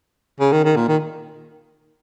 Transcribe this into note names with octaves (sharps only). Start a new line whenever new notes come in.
C#3
D#3
D#3
A#2
D#3